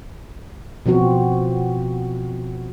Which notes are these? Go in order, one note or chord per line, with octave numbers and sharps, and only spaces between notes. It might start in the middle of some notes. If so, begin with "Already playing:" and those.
B2 F3 C4 F#4